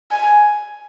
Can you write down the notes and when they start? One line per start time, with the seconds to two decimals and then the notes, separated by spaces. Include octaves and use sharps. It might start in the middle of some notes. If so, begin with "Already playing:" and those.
0.11 G#5